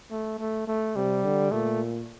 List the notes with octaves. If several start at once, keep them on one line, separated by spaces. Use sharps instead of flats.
A3
A3
A3
C3 G3
D3
A#2 A3